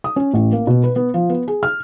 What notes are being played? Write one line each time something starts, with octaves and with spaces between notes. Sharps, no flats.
D#6
C#4
A1
A#3
B2
B4
B3
F3
B3
G#4
F6